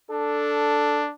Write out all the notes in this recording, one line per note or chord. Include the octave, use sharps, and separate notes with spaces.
D4 A4